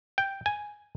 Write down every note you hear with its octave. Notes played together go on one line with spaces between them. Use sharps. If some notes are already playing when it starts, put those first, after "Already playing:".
G5
G#5